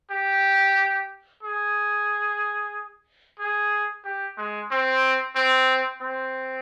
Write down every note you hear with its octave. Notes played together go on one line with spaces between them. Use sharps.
G4
G#4
G#4
G4
G#3
C4
C4
C4